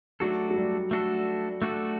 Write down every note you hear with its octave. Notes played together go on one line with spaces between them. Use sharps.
F#3 A3 D4 F#4 A4
F#3
G3
A3 D4 F#4 A4
A3 D4 F#4 A4